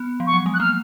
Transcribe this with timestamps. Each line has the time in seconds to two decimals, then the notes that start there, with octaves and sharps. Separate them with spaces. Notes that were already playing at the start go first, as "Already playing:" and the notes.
Already playing: B3
0.20 F3
0.27 C#6
0.33 F#3
0.46 G#3
0.54 F#6
0.60 A#3 F6